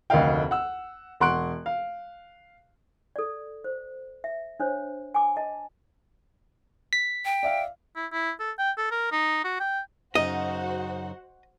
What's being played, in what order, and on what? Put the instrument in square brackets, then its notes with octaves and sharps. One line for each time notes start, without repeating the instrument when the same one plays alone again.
[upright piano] F1 D2 A#3 D#5 F5 G5
F#5 E6
E1 F#5 C6 C#6 F#6 D7
F5
[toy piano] A4 D5
C5
E5
D4 C5 C#5
G#5 D6
D#5 A5
[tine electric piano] B6
[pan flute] G5
[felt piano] D5 E5 F5
[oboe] E4
E4
A4
G5
A4
A#4
D#4
F#4
G5
[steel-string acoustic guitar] F#2 C#3 D#4 [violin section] F#4 C5 F#5 [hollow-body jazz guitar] D#5